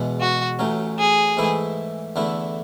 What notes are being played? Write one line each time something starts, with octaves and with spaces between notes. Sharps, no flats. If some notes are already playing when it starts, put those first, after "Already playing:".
Already playing: E2 B2 G#3
F#4
A1 A2 F#3 C#4
G#4
G#2 E3 A3 E4
E2 D3 A3 E4